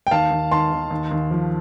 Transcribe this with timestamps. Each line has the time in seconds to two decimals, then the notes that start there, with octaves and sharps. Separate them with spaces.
0.07 G5
0.11 D#2 F5 A5
0.31 D#2
0.51 D#3 A5 C6
0.72 D#3
0.91 D#2
1.11 D#2
1.31 F3